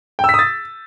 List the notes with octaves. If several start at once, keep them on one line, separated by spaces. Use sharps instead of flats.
G5
E6
B6
D#6
A6